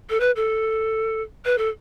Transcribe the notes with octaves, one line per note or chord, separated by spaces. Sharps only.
A4
B4
A4
B4
A4